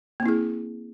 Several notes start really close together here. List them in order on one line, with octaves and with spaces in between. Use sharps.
A#3 C4 E4 G#4